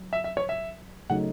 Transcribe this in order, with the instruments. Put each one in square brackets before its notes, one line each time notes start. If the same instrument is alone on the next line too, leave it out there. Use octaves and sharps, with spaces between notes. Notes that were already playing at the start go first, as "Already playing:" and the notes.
Already playing: [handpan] F#3
[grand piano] E5
E5
C#5
E5
[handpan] C#3 F#3 A3 D#4 [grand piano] F#5